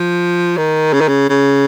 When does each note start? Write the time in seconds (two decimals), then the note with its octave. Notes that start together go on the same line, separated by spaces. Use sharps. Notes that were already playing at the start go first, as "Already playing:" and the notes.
Already playing: F3
0.57 D#3
0.93 C#3
1.01 D#3
1.08 C#3
1.30 C#3